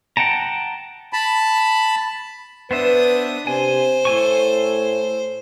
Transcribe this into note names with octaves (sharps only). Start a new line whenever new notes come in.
F#5 G5 A5 A#5
A5 B5
B3 D4 B4 C5 E5 D#6
C3 C5 G#5
A2 A4 G#5 C#6